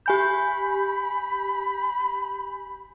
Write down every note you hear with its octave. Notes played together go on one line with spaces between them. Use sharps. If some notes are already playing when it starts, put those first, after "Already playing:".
G4 G#5 B5 G6